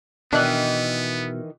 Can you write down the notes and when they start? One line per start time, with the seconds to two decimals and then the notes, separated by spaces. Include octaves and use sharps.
0.33 B2 D#3 E3 B3 D4 F#6